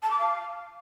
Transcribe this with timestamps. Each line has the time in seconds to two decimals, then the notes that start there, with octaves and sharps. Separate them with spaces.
0.03 A5
0.11 D6
0.19 F5